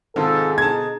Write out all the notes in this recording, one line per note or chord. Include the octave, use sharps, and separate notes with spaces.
G#2 C3 D#3 F4 A4
B2 D3 D#4 A5 G#6